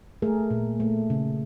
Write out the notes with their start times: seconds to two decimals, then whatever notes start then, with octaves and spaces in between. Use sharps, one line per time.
0.22 A3 G#4 A#4
0.51 A#2
0.80 A3
1.10 C#3